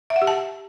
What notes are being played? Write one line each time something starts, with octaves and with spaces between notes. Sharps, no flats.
E5
F#5
G4
A5